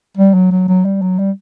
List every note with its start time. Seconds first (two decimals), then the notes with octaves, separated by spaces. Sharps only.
0.17 G3
0.34 F#3
0.51 F#3
0.68 F#3
0.85 G3
1.02 F#3
1.18 G3